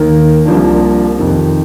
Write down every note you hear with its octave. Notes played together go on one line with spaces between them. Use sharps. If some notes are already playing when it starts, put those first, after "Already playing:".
Already playing: D#2 D#3 A#3
C2 C3 F3 A#3 D4
F2 C3 D#3